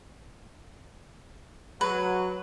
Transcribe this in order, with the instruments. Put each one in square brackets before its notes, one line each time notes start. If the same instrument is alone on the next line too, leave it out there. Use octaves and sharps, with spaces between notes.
[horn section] F#3 [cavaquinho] B4